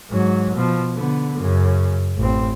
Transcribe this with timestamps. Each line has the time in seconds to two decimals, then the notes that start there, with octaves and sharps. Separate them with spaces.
0.10 G#2 F#3
0.55 B2 F3
0.95 D3 B3
1.38 F#2 C#3
2.18 A1 C4